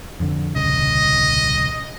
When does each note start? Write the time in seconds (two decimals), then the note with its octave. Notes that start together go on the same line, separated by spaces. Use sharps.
0.20 F2 D3
0.56 D#1 C2 C#3 D#5